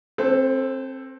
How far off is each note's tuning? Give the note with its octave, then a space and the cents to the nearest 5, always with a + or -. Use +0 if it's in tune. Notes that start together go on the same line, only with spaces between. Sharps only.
C4 +20 A4 +0 C5 -35